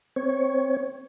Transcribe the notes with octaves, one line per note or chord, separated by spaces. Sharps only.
C4 C#5